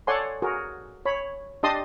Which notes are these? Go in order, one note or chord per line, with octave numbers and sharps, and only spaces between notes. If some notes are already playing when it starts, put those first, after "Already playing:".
A4 C#5 D5 F#5 G#5 C6
F#4 G#4 A#4
C#5 B5
D4 G4 D#5 A5 C6 D#6